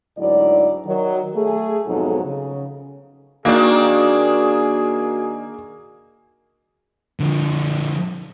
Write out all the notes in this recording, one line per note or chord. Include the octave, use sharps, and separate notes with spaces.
D2 G#2 F#3 E4 D5
D#3 F#3
A3 G#4
F2 G#2 B2 F#3 D#4 A4
C#3
D#3 A#3 D4 F#4 G#4
D3 F3